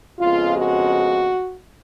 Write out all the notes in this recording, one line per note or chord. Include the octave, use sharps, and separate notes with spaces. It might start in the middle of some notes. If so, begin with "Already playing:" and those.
F2 C#3 G#3 B3 F4
F#4